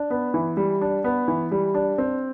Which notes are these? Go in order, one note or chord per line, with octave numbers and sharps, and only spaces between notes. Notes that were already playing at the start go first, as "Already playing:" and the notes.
Already playing: D4
B3
E3
G3
D4
B3
E3
G3
D4
C4